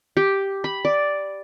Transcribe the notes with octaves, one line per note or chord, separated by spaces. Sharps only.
G4
B5
D5